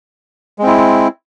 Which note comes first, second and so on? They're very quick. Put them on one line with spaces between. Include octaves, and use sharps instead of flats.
G#3 C4 E4